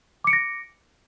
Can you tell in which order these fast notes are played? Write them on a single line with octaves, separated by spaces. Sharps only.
D6 C#7 D7 A#6